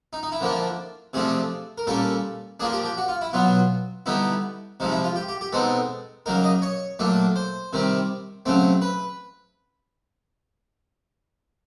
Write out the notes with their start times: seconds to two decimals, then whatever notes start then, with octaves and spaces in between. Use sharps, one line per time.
0.13 D#4
0.23 D#4
0.32 E4
0.40 D3 F3 A#3 D4
1.13 C3 F3 A3 D4 G#4
1.78 A#4
1.87 A#2 G3 A#3 C#4 A4
2.60 F3 A#3 D4 G#4
2.73 G4
2.85 G4
2.97 F#4
3.08 F4
3.21 E4
3.33 B2 F#3 B3 F4
4.06 D3 G3 B3 D#4 E4
4.80 C3 F3 G#3 D#4
4.92 E4
5.04 F4
5.16 G4
5.28 G4
5.41 G4
5.52 B2 G#3 C4 D#4 A4
6.26 C#3 F#3 A#3 D#4 A#4
6.44 D#5
6.62 C#5
6.99 A#2 F#3 A3 D4
7.36 C5
7.73 C3 D#3 G3 C4
8.46 C#3 F#3 A3 C4
8.82 B4